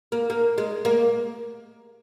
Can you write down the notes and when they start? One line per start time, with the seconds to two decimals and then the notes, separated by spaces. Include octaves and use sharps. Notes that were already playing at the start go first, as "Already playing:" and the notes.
0.12 A#3
0.30 A#3
0.58 G#3
0.85 A#3